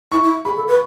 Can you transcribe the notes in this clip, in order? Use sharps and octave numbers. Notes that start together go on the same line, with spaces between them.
E4 C#6
E4
G#4 B5
A4
B4